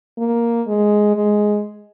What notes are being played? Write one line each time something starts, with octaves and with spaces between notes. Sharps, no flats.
A#3
G#3
G#3